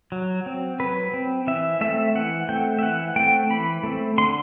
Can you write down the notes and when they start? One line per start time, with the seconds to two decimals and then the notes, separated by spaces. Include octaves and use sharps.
0.12 F#3
0.46 C4
0.80 F#3 B4
1.14 C4
1.47 E3 E5
1.81 A3 C4 E5
2.15 E3 F#5
2.49 A3 C4 G5
2.79 E5
2.83 E3 F#5
3.16 A3 C4 G5
3.50 E3 B5
3.83 A3 C4
4.18 D3 C6